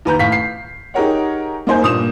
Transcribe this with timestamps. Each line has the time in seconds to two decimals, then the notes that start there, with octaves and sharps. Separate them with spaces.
0.05 D#2 B4 A#5 G6
0.19 A2 F5 B6
0.32 C7
0.94 D#4 G4 G#4 A#4 C#5 F#5
1.67 A#3 D#4 C5 G#5 G6
1.81 G2 A#2 D#6 E7